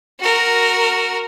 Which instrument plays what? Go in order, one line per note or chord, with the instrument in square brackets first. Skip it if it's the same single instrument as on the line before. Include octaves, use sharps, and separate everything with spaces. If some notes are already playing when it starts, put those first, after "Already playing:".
[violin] F#4 A#4